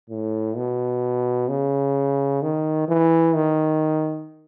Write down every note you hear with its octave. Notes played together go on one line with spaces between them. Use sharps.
A2
B2
C#3
D#3
E3
D#3